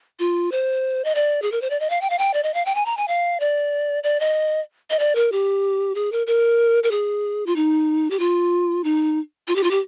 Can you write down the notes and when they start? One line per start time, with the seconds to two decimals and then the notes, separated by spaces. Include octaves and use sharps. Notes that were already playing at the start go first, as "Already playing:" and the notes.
0.20 F4
0.52 C5
1.05 D#5
1.15 D5
1.42 G#4
1.52 A#4
1.62 C5
1.70 D5
1.80 D#5
1.90 F5
2.01 G5
2.10 F5
2.19 G5
2.34 D5
2.43 D#5
2.54 F5
2.66 G5
2.75 G#5
2.86 A#5
2.97 G#5
3.08 F5
3.40 D5
4.03 D5
4.20 D#5
4.90 D#5
4.99 D5
5.15 A#4
5.32 G4
5.95 G#4
6.12 A#4
6.27 A#4
6.83 A#4
6.91 G#4
7.46 F4
7.56 D#4
8.10 G4
8.19 F4
8.84 D#4
9.48 F4
9.56 G4
9.64 F4
9.71 G4